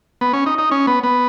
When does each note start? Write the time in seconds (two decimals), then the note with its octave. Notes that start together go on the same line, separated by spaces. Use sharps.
0.21 B3
0.33 C#4
0.46 D#4
0.58 D#4
0.71 C#4
0.87 B3
1.03 B3